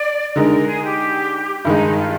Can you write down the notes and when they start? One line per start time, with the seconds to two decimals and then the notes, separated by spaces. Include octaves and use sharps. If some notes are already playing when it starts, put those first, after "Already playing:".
Already playing: D5
0.35 D3 G#3 D#4 A#4
0.67 G#4
0.83 G4
1.65 G2 D#3 G#3 D#4
1.97 F4